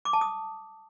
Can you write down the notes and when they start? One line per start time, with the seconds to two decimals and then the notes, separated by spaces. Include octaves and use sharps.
0.05 D6
0.13 A5
0.21 D#6